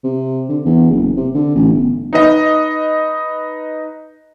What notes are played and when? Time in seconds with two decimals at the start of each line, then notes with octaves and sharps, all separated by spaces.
0.03 C3
0.49 D3
0.65 E2
0.91 F#1
1.16 C3
1.34 D3
1.55 A1
1.73 G1
2.13 D#4 B4 D#5